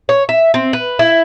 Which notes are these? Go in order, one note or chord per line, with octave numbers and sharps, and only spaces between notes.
C#5
E5
C4
B4
E4